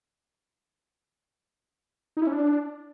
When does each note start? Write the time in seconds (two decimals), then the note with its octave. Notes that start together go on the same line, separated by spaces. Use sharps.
2.17 D#4
2.22 E4
2.27 C#4
2.32 D4